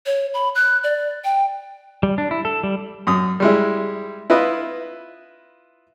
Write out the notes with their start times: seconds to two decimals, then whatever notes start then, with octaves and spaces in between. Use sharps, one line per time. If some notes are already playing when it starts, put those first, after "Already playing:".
0.06 C#5
0.34 B5
0.55 F#6
0.83 D5
1.24 G5
2.03 G3
2.18 D4
2.31 E4
2.45 A4
2.63 G3
3.07 F#2 D#6
3.40 G3 G#3 E4
4.30 E4 F4 B4 D#5